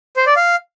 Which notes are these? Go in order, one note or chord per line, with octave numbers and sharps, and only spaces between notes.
C5
D5
F5